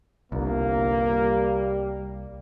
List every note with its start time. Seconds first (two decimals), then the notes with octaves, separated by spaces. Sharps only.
0.32 G1 C2 A#3
1.07 G3